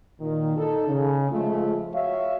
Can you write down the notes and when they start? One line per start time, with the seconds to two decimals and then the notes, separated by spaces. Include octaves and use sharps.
0.20 A#2 D#3
0.57 D#4 A4
0.88 C#3
1.31 F3 G#3 A3 F4
1.93 F#4 C#5 E5 F5